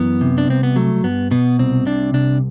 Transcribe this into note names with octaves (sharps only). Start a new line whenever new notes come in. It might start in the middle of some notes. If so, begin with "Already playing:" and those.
Already playing: F#2 E3 B3
C3
D4
C2 C4
B3
F#3 A3
G2 B3
B2 B3
C2 C4
C3 D4
C2 D4